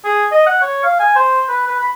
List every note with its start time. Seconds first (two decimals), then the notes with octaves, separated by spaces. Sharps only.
0.04 G#4
0.31 D#5
0.46 F#5
0.61 C#5
0.83 F5
0.99 G#5
1.15 C5
1.49 B4
1.67 B4
1.80 B5